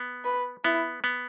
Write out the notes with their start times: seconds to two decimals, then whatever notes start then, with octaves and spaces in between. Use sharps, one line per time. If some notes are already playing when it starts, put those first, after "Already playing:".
Already playing: B3
0.25 B4
0.64 B3 E4
1.04 B3